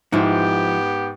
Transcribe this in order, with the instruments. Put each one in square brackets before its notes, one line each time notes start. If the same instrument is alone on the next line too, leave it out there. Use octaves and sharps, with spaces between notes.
[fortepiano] G#2 [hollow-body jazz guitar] F3 E4 [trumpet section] B3 G4